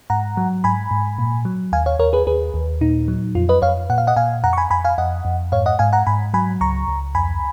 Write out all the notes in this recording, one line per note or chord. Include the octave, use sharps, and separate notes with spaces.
G#2 F#5 A#5
F#3
G#2 G#5 B5
G#2
A#2
F#3
D#2 F5 G#5
C#5 F5
D#2 A#4 C#5
G#4 B4
D#2 G#4 B4
D#2
A#2 D#4
F#3
F2 F4
B4 D#5
F2 C#5 F5
A#2 F#5
F5
D#5 F#5
A#2 F5 G#5
F2 F#5 A#5
C#6
G#5 B5
F2 G#5 B5
F5 G#5
F2 D#5 F#5
F2
G#2 C#5 F5
D#5 F#5
G#2 F5 G#5
F#5 A#5
G#2 G#5 B5
F#3 G#5 B5
C#2 A#5 C#6
C#2
F2 G#5 B5